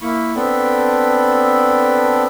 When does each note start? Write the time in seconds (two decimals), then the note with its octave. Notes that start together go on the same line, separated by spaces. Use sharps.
0.01 A#3 E4 B5 C#6
0.35 B3 C4 D4 A4 B5